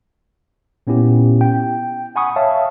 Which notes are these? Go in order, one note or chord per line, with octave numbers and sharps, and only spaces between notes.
A#2 B3 C#4 E4 G4
G5
F#5 G#5 B5 C#6 D#6
C#5 E5 F5 A5